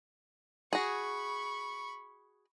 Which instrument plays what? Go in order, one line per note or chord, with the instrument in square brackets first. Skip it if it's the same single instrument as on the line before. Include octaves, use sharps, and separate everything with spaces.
[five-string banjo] F#4 G#4 [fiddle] B5 C#6